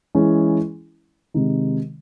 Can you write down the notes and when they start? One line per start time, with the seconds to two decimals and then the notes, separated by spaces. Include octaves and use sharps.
0.14 E3 G#3 C#4 E4 G#4
1.34 C3 D#3 G#3 D#4